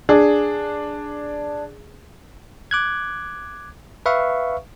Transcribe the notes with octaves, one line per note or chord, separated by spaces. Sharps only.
D4 G#4
D6 F#6 G#6
B4 E5 F5 C#6